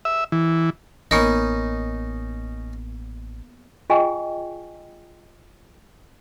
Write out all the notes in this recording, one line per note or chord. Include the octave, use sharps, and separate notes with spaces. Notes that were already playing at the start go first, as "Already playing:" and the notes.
E5
E3
A1 A#3 B3 C#4 D#4 A#4
F4 G#4 D#5 G5 G#5 C#6